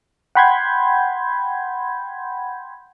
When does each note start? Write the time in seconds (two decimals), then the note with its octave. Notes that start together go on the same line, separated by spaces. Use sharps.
0.35 F#5 G5 B5 C6 G6 G#6